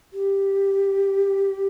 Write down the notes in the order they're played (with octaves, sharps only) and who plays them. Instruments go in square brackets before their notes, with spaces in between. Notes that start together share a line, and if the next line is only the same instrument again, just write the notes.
[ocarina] G4